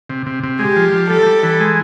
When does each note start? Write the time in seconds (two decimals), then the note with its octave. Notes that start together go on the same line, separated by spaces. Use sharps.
0.10 C3
0.26 C3
0.44 C3
0.59 G#3 G4
0.76 F3
0.93 F3
1.10 G3 A4
1.26 G3
1.43 E3
1.60 G#3